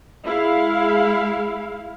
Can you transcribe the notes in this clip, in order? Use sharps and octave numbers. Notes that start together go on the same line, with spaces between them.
G#3 E4 F5